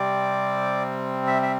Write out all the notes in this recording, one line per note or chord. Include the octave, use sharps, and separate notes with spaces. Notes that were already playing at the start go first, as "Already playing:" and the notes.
Already playing: C3 G3 C4 D5
E5
E5